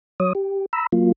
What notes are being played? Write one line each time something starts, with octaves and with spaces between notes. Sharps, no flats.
F#3 C#5 D#6
G4
A#5 B5 E6
F#3 A#3 F4